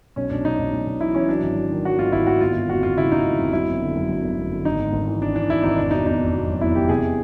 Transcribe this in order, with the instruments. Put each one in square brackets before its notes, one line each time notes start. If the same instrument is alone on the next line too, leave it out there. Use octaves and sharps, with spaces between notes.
[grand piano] B1 C#4
B1 D4
B1 D#4
B1
B1
B1
E3 E4
E3 C#4
F#3 D4
G#1
F#3
D#3
F#3 F#4
G#1 F4
G#1 E4
G#1 F#4
G1 F4
G1
F2 F#4
G1 F4
C#3 E4
G1 D#4
G1
F2
F#3 E4
G1
D3
F#2
F#2
G1
G1
D3
G#1 D#4
G#2
G#1
E3
G#1 D4
E3 D4
G#1 E4
G#1 D#4
F1 D4
B2 D#4
E2 D#4
F1
B2
F#3
E2 E4
E2 G4
C3 G#4